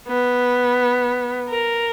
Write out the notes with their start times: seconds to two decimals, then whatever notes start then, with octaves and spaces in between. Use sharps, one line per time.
0.08 B3
1.50 A#4